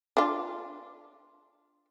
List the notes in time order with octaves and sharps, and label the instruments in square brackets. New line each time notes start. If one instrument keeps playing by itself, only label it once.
[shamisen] D4 F4